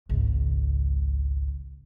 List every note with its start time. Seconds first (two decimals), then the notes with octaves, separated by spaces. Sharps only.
0.09 G#1 C#2